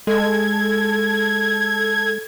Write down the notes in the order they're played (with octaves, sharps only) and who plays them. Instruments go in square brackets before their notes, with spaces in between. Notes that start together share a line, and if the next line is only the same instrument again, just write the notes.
[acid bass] G#3 [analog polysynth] A4 G#6